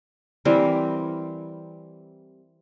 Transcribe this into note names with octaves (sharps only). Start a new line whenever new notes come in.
E3 G3 C4 A#4